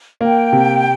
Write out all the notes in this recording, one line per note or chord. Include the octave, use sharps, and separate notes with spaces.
A#3 G5
C3